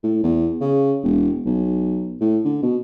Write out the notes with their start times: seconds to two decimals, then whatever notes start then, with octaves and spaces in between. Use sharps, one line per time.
0.03 A2
0.24 E2
0.61 C#3
1.04 E1
1.46 B1
2.21 A2
2.45 D3
2.63 B2